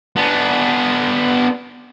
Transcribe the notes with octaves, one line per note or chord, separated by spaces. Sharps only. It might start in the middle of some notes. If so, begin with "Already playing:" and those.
B3 D4